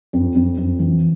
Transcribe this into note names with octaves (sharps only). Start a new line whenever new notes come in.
F2
F2
F2
E3